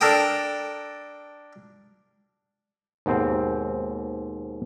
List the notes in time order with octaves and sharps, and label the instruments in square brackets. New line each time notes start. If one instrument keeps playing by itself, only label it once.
[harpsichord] D4 A4 A#4 G5 D#6
[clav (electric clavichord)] D#2 G#2 B2 C4